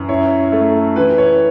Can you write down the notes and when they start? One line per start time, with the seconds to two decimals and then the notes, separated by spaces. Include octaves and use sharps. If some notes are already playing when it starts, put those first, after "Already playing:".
Already playing: F#2 E3
0.09 E4 C#5
0.52 A3 A4
0.96 E3 B4
1.18 C#5